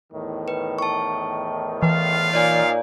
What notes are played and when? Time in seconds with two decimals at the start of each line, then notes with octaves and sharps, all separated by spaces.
0.13 E2 A2 D#3
0.48 B4
0.79 A5 C#6
1.83 E3 A3 F4 F5
2.33 A#2 D#4 C#5 D5 G#5